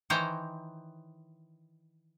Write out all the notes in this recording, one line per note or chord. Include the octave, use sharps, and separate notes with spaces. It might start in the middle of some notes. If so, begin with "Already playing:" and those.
D#3 E3 C5 C#5 G5 A#5